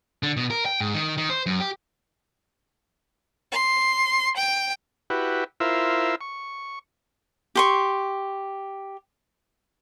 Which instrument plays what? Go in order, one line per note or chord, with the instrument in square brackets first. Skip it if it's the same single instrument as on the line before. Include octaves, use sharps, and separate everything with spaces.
[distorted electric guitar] D3
B2
A#4
G5
G#2
D#3
D#3
C5
F#2
G4
[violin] C6
G5
[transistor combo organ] E4 F#4 G4 B4
E4 F4 A#4 C5 E5
C#6
[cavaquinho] G4 C6 C#6